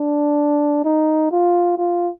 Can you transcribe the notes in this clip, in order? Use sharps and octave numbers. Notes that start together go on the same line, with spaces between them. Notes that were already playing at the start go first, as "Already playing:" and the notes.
Already playing: D4
D#4
F4
F4